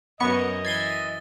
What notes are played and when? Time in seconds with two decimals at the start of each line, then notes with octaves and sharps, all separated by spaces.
0.20 F#2 B3 A#4 C#5 D#5 C#6 C#7
0.65 E3 G#6 A6 C7 G7